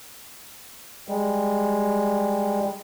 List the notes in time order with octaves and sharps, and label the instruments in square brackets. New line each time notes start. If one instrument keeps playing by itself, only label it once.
[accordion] G3 G#3